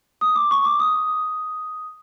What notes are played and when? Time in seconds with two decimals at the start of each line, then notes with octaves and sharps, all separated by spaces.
0.21 D#6
0.36 D6
0.51 C#6
0.65 D6
0.80 D#6